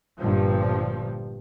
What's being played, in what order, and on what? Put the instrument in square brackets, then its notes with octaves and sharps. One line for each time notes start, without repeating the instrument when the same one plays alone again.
[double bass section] G1 G2 A#2 F3